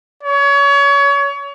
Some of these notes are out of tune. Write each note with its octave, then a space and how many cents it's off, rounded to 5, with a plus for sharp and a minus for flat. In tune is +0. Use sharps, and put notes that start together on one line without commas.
C#5 +30